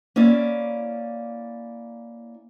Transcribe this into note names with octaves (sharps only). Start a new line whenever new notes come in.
A#3 C#4 E4 D5